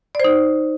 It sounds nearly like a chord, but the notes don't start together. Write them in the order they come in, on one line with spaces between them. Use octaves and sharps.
D5 C5 D#4